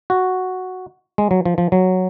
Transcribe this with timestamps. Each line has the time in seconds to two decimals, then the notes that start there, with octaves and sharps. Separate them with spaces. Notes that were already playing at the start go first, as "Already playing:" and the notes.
0.10 F#4
1.18 G#3
1.31 F#3
1.45 F3
1.58 F3
1.72 F#3